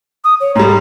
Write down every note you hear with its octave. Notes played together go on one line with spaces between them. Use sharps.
D#6
C#5
G#2 G3 A#5